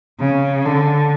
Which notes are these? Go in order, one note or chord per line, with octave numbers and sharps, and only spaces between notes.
C#3
D3